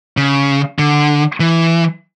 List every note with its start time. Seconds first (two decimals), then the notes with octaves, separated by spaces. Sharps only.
0.17 C#3
0.79 D3
1.40 E3